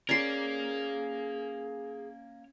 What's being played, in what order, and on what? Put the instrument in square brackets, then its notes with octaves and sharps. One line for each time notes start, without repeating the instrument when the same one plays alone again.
[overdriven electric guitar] A#3 A#4 [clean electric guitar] C#4 [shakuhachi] G#4 [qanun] D5 C6